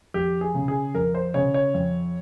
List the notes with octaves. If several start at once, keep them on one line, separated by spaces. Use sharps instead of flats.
F2 G4
G#4
C#3
G#4
F2 A#4
C5
C#3 C#5
C#5
F2